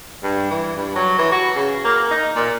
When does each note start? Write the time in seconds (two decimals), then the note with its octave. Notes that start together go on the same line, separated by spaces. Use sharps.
0.23 G2
0.51 E3
0.77 G2
0.96 F#3
1.19 E3
1.32 F#4
1.55 C#3
1.85 A#3
2.11 D#4
2.36 A#2